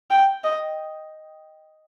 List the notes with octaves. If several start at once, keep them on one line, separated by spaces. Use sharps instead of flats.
G5
D#5